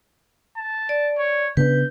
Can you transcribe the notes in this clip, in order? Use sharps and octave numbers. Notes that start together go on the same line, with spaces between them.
A5
D5
C#5
C#3 B3 D4 B4 G6